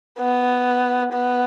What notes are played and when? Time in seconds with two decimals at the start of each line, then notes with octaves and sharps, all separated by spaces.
0.19 B3
1.13 B3